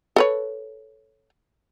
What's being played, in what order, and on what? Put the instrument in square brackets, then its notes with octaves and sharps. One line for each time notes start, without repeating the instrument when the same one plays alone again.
[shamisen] A4 B4 C#5